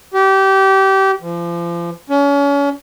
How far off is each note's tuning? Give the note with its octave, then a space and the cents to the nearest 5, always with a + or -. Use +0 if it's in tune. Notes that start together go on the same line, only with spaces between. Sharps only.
G4 -25
F3 -35
C#4 +35